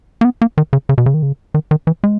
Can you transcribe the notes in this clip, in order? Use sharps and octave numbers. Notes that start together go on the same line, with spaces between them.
A#3
B3
A#3
D#3
C#3
C#3
B2
C#3
D#3
C#3
D#3
D#3
E3
G#3